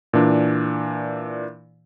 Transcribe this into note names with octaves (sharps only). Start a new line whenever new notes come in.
A#2 E3 D4